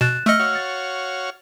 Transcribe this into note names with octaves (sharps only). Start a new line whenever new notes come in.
B2 F#6 A6 E7
A3 D#5 E6 F6 C#7
F#4 C#5 F5
A6